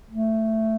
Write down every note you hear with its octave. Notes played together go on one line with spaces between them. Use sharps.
A3